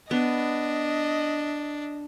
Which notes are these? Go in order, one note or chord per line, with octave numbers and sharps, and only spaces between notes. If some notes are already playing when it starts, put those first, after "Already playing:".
B3 D4 D#5